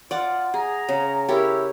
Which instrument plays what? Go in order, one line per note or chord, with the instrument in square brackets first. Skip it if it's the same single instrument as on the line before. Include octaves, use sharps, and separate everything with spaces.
[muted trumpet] F4 [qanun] D5 F#5 D6
[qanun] G#4 [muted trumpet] A#5
[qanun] C#3
[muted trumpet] E4 [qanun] G4 A#4 C#5